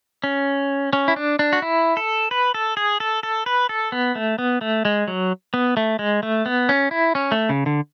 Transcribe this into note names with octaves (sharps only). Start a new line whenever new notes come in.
C#4
C#4
E4
D4
D4
F#4
E4
A4
B4
A4
G#4
A4
A4
B4
A4
B3
A3
B3
A3
G#3
F#3
B3
A3
G#3
A3
B3
C#4
E4
C#4
A3
C#3
D3